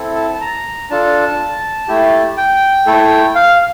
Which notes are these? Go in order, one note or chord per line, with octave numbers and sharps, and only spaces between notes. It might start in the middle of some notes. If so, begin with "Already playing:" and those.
Already playing: C4 E4 A4
A5
A5
A#5
D4 F4 A4 A5
A3 E4 G4
G5
A3 E4 A4
F5